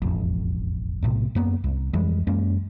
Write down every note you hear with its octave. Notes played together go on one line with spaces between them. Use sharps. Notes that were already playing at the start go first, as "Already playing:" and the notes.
E1 A1 F2
B1 A2 C3
F#2 A#3 B3
C2
F2 E3 G3 G#3
F#2 G#3 A#3 C#4